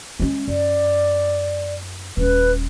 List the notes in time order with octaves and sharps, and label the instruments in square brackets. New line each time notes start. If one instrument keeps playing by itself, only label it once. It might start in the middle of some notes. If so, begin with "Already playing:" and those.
[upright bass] G#3 C#4
[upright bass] F#2 [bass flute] D5
[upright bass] D#1 C#4 [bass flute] B4